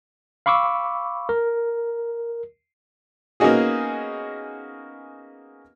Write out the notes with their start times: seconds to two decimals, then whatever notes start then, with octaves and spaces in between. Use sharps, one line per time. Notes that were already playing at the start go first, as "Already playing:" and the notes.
0.46 F5 B5 C#6 D6 E6
1.29 A#4
3.40 A#3 B3 C#4 D#4 F#4 G#4